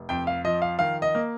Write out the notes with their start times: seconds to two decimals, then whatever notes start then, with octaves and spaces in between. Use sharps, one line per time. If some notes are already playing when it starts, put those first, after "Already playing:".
Already playing: F1
0.09 F2 G5
0.27 F5
0.44 F3 D#5
0.62 F5
0.79 D#3 F5
1.02 D#5
1.15 A#3